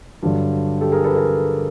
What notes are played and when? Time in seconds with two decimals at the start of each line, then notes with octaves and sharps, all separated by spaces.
0.23 G2 D3 F#3
0.81 G4 A4
0.92 G#4 A#4
1.04 A4 B4
1.16 G#4 A#4